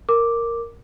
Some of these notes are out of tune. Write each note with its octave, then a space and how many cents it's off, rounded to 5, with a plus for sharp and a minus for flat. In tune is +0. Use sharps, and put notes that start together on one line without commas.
A#4 -5 D6 +0